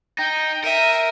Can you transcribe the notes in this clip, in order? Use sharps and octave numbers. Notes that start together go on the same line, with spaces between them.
D#4 G5
A#4 E5 D#7